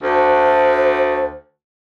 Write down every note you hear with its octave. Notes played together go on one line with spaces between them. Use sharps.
D2 C5